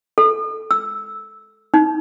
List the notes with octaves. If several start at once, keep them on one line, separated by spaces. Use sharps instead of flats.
A4
E6
D#4